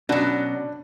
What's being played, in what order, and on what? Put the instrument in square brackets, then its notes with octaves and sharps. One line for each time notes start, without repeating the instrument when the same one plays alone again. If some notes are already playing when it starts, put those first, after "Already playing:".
[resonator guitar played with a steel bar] B2 F#3 [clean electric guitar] C#4 D5 [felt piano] D4